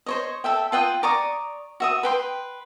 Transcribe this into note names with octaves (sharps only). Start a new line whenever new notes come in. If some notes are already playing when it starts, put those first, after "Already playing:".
C5 C#5 D#5
A4 E5 G5
F4 F#5 G5 D#6
D5 A#5 C#6 D#6
F#4 E5 D#6
B4 G5 C6